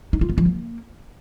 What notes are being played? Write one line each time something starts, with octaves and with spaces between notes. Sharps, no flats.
D#4
F4
B3
F3
A#3